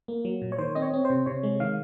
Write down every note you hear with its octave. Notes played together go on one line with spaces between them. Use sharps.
A#3
F#3
A#2
C#5
D#3 C5
C4 D#5
C#5
C4
C5
C3
C3 C#5
G#3
D#3 F5